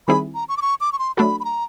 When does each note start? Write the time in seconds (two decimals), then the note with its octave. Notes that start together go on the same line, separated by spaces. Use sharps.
0.07 D#3 G3 C4 E4 G#4 B5
0.35 A#5
0.49 C#6
0.57 D6
0.62 C#6
0.81 D6
0.92 C#6
0.99 C6
1.17 F#3 A3 D4 F#4 A4 B5
1.40 B5
1.45 A#5